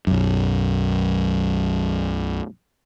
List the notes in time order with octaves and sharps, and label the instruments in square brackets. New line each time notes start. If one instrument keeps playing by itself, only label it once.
[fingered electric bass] B1 F#2